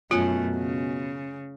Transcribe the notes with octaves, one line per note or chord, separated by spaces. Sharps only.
F#2 B2 A3 C#4 F4 F#5
C#3